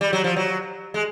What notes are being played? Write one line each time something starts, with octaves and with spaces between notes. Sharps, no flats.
G3
F#3
F3
F#3
G#3